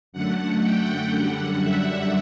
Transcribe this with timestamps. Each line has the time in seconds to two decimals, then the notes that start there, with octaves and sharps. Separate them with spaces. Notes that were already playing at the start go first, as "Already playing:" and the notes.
0.13 F#2 D3 A3 F#5
0.62 G5
1.12 F#2 D3 G3 F#5
1.61 E5